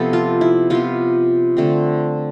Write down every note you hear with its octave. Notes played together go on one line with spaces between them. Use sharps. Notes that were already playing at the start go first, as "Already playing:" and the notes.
Already playing: C3 F3 B3 A4
F4
E4
C3 F3 B3 F4
D3 A3 C4